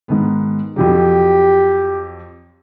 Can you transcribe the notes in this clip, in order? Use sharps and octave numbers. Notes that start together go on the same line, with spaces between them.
G#2 D#3 B3
F2 F3 F#3 G4